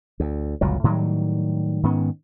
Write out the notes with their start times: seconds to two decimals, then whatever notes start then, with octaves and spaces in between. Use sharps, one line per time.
0.20 D2
0.61 G1 C#2 A#2 F#3
0.84 A2 D#3 F#3 G3
1.83 G#2 D#3 B3 C#4